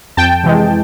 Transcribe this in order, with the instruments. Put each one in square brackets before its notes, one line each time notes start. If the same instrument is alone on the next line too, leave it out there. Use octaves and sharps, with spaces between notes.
[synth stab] F2 G5 A5
C3 E3 G#3